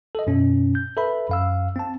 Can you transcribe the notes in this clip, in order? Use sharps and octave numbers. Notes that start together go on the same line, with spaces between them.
A4 D#5
F#2 B2 C#4
G6
A4 B4 E5 B5
F#2 F5 E6
C4 A5